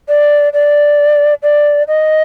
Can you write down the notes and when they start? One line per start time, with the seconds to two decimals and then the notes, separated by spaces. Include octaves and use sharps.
0.09 D5
0.53 D5
1.43 D5
1.88 D#5